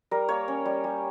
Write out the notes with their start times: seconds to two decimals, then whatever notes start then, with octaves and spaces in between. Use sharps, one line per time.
0.11 G3 A#4
0.29 A#3 C#5
0.48 C#4
0.66 G3
0.84 G3